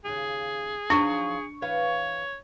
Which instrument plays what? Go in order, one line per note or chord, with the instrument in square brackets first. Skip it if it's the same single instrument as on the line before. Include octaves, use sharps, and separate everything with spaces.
[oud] D#2 C#3 [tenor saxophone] G#4
[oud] F3 F#3 D#4 [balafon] D4 [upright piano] C#6
[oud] E3 B4 F5 [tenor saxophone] C#5